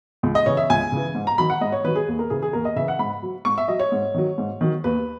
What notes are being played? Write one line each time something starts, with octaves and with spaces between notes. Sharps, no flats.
C#2
D#5
C#3 E3 C#5
E5
C#2 G#5
C#3 E3
G#2
A#5
D#3 F#3 B5
F#5
G#2 D#5
C#5
D#3 F#3 B4
G#4
D#2
A#4
C#3 E3 G#4
G#4
D#2 A#4
D#5
C#3 E3 E5
F#5
G#2 B5
F#3
G#2 C#6
E5
F#3 D#5
C#5
G#2
D#3 F#3
G#2
D#3 F#3
D#2 B4